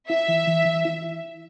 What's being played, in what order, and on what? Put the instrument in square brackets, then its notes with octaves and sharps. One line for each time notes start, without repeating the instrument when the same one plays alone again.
[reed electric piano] E4 [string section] E5
[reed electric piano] E3
E3
E3
E4